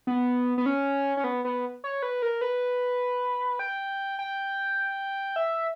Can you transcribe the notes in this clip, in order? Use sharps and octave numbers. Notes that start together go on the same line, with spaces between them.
B3
B3
C#4
C#4
B3
B3
C#5
B4
A#4
B4
G5
G5
E5